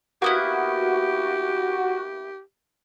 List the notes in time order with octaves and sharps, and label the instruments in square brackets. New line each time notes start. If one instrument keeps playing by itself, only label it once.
[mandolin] A#3 B3 E4 [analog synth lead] F#4 [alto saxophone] G4